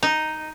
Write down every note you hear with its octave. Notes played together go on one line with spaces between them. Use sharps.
D#4